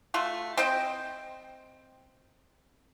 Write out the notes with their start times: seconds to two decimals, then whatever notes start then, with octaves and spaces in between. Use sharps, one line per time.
0.14 A3 F4 F#4
0.57 C4 C5 D#5 G5